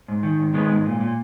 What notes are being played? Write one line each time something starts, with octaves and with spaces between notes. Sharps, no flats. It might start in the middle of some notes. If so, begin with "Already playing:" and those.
G#2
D#3
G#2
D#3 G#3 B3
G#2
A#2
A#2